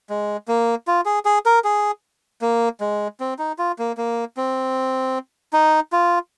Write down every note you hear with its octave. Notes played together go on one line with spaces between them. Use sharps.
G#3
A#3
F4
G#4
G#4
A#4
G#4
A#3
G#3
C4
D#4
F4
A#3
A#3
C4
D#4
F4